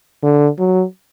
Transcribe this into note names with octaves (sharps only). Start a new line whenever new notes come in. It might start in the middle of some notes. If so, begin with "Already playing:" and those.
D3
F#3